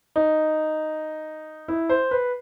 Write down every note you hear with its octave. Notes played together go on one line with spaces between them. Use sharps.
D#4
E4
C5
B4